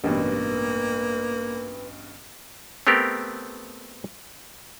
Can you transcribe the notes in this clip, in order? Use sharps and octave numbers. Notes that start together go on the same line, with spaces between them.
A1 G2 B2 A#3 B4
A3 B3 C4 G4 A#4